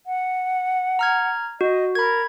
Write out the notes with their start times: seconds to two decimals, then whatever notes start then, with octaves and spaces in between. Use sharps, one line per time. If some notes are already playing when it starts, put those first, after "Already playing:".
0.06 F#5
0.99 A#5 F6 G#6
1.61 F#4 D#5
1.95 A#4 B5 G#6